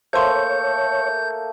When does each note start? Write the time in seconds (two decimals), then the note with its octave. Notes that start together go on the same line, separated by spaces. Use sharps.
0.13 A3 A#3 C5 C#5 C6 G6